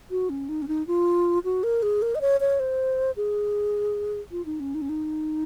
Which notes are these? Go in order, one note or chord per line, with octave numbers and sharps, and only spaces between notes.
F#4
C#4
D#4
C#4
D#4
F4
F#4
A#4
G#4
A#4
D#5
C#5
C#5
C5
G#4
F4
D#4
C#4
D#4
C#4
D#4